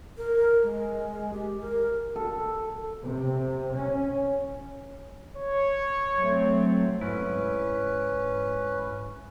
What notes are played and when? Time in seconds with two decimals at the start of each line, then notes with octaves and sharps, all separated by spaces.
0.18 A#4
0.63 G#3
1.33 G4
1.61 A#4
2.16 A4
3.02 C3
3.74 C#4
5.37 C#5
6.16 F#3 A3 C4
7.01 G#2 C#4 E4 B4